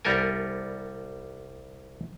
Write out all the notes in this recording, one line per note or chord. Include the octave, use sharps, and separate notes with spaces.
C2 G3 B3 A4 A#4 G#5